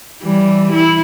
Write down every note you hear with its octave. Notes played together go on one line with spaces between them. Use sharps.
E3 G3
E4